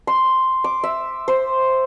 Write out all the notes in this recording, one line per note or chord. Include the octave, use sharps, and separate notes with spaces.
C6
D6
E5
C5